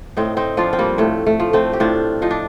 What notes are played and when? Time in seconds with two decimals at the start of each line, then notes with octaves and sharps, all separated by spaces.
0.17 A2 C4 D#4
0.37 C4 D#4
0.57 F3 D4 F4
0.73 C4
0.79 G3 A#3
0.98 A2 A3
1.26 A3
1.40 F3
1.53 A3 C4
1.73 G4
1.80 A2 D4 F4
2.22 F3 D#4
2.31 D4